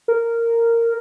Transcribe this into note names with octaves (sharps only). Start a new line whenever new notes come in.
A#4